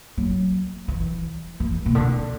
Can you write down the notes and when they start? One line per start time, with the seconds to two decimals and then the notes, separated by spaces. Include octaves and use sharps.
0.18 F#3
0.88 E3
1.60 E3
1.86 B2
1.95 D3